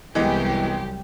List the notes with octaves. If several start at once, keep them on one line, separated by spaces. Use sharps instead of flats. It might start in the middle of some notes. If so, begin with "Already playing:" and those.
C2 E3 F#3 G#3 B3 G4